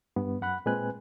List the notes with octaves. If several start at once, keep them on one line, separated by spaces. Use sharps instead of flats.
G2 B3
F#2 F#5 B5 F#6
A#2 G#3 C4 B4 G#5 F#6